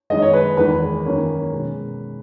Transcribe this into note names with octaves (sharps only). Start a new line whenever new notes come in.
F#2 D#3 G#3 D#5
C#5
B4
E2 D#3 G#3 B4
F#2 D#3 A#3 C#4
B2 G#3 C#4